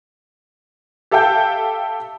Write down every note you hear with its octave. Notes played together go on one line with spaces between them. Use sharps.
G4 A4 E5 F5 G5 G6